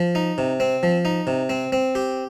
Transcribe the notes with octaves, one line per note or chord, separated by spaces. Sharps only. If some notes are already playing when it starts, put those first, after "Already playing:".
Already playing: F3
D#4
C3
C4
F3
D#4
C3
C4
C4
G4